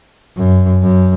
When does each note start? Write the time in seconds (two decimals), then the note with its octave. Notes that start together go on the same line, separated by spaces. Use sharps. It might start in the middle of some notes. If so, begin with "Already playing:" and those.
0.37 F#2
0.83 F#2